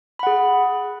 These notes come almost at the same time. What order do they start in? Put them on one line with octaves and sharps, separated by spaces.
B5 F#5 G#4